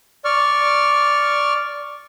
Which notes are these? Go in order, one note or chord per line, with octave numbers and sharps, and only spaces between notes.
D5 C#6 F6